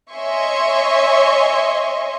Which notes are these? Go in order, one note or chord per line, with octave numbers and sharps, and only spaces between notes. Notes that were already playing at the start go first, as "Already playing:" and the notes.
C#5 D#5 E5 G#5 C6 C#6